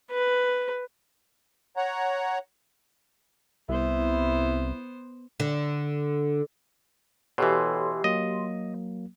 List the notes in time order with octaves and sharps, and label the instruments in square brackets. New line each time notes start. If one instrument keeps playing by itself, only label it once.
[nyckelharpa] B4
[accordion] C#5 F#5 A#5
[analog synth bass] C2 [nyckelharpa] B3 C5 [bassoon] E4
[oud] D3
[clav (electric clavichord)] B2 E3 [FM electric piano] G4 C6 [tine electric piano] A4 C#5
[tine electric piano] F#3 A#3 [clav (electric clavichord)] D#5